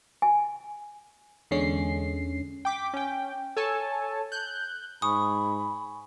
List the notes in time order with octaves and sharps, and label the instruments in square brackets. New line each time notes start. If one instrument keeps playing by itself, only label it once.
[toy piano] G#5
[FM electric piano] E2 D3 G#3 C#4 C7
[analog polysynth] G5 D6 B6
C#4 G5
A4 C#5 G#5 A5
F#6 G6
[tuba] G#2 [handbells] G#5 C#6 [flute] B5 [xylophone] D#6